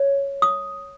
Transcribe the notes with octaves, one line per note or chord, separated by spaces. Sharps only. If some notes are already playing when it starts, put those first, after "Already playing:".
Already playing: C#5
D#6